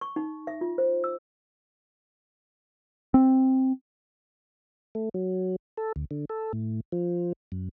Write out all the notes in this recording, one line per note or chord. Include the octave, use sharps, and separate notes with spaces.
C#6
D#4
E5
F4
C5
E6
C4
A3
F#3
A4
D2
D3
A4
A2
F3
F#2